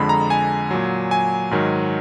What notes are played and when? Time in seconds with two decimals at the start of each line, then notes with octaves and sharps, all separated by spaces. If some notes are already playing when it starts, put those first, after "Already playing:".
Already playing: F2 D3 G#3 B5
0.09 A#5
0.30 G#5
0.71 A#2 F#3
1.11 G#5
1.51 G#2 D#3 F#3